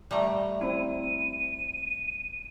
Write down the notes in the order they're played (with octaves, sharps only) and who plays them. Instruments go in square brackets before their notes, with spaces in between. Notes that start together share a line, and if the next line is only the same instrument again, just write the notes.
[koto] G3 A3 A#5
[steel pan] C4 E4 [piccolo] D#7